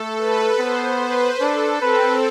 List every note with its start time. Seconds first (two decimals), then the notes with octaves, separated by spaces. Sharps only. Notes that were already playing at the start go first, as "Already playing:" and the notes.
Already playing: A3 A4
0.18 B4
0.59 B3 C5
1.00 B4
1.40 D4 A4
1.81 C4 B4